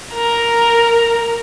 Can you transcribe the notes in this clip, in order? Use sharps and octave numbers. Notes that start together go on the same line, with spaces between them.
A#4 A#5